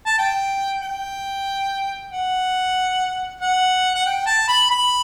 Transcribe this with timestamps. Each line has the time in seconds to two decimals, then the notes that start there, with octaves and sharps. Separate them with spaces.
0.06 A5
0.18 G5
0.82 G5
2.11 F#5
3.41 F#5
3.95 F#5
4.06 G5
4.26 A5
4.48 B5
4.70 B5